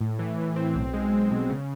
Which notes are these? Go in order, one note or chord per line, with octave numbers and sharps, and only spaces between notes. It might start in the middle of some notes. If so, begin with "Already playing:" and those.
A2
E3
A2
C4
B1
G#3
G#3
B2
C#3